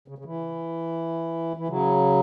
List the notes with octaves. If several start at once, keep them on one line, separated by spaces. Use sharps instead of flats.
C#3
C#3
E3
E3
C#3 F#3